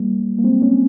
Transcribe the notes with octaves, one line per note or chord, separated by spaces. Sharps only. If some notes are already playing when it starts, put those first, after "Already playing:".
Already playing: G3 A#3
A#3
G#3 C4
A#3 C#4